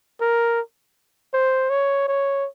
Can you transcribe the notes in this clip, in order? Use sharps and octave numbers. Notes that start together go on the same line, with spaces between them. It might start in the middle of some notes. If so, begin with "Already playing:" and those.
A#4
C5
C#5
C#5